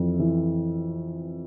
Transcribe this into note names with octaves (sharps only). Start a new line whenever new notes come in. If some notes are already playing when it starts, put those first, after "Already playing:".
Already playing: F2 E3
E3